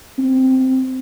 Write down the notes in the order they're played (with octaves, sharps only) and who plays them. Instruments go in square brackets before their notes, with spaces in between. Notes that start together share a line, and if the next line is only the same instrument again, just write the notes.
[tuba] C4